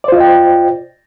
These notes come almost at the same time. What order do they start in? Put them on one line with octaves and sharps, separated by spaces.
D5 C5 F4 D#5 G5